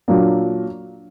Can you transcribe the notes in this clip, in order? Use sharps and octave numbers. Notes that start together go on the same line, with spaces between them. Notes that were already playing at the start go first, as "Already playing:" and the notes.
A#2 F#3 A#3 D4